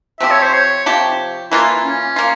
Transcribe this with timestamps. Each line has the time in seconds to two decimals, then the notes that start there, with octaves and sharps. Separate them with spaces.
0.20 C3 F3 C4 G4 E5
0.31 C#5
0.42 C5
0.54 C#5
0.86 C3 F3 C4 G4
1.51 E3 A#3 E4 F4
1.84 C#4
2.16 A#3 F4